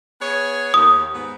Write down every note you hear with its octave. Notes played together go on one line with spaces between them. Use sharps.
B3 G#4 C#5
D#2 D#6
G#2 B3